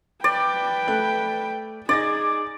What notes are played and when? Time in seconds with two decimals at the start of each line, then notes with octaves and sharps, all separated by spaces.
0.24 B4 D5 G5
0.88 A3 F#6
1.89 D#4 G#4 D5 A6 A#6